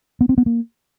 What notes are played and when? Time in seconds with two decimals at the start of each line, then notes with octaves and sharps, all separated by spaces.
0.21 B3
0.29 C4
0.38 B3
0.46 A#3